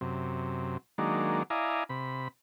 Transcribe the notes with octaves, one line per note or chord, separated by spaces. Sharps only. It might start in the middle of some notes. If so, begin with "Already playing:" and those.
F#2 C3
D#3 F#3 G#3 A#3 D4
E4 D5 D#5 F5 G#5 A#5
C3 B5